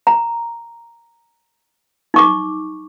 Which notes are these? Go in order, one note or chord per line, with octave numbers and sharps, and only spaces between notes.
A#5
D#4 C#6 D6